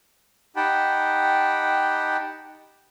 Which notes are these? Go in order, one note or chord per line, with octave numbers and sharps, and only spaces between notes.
D#4 G4 F#5 G5 A5 B5